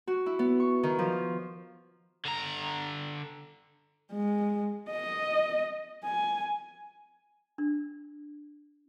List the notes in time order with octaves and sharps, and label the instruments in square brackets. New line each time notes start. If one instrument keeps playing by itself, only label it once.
[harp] F#4
E4
B3
C#6
D#3
F3
[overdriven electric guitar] D3 A#5
[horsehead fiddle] G#3
D#5
G#5
[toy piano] D4